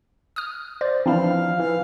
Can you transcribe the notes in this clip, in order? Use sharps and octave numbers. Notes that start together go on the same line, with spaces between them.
D#6 F6
C5 D5
E3 F3 C4 D4 E4 F5
E3 F5